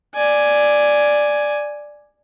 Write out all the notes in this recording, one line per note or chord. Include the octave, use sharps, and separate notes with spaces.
D5 G#5